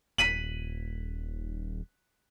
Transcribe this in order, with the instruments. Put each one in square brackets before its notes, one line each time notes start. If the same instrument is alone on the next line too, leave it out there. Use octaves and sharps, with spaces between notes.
[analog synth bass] D#1 [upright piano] B6 D#7 F#7